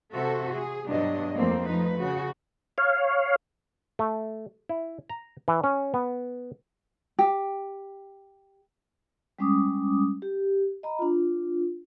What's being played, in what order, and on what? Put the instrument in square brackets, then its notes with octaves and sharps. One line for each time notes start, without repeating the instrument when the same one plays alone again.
[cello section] C3 F#4 A4 C5 E5
G#4
G2 B2 F#3 G3 D4 D#5
F2 A3 A#3 C4
F3 A3 D#4 B4
C#3 F#4
[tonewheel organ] C#5 F5
[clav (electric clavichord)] A3
E4
A#5
E3
C#4
B3
[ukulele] G4
[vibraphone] G3 G#3 C#4 D6 D#6
G4
D#5 A#5 B5
D4 F4